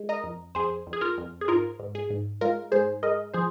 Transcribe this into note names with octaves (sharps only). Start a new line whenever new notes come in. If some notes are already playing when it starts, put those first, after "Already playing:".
Already playing: G#3
A#4 D#5
F2
F2 G#4 C5
F2
G#4
F4 A#4
F2
G#4
G#2 F4 A#4
G#2
G#4
G#2
G#3 F4 A#4
G#2 G#4 C5
G#3 A#4 D#5
F3 G#4 C5